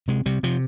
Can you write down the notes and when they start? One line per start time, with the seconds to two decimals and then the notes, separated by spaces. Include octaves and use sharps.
0.08 C3 G#3
0.26 C3 G3
0.43 C3 F3